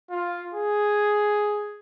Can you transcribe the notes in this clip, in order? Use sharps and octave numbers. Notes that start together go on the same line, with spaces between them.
F4
G#4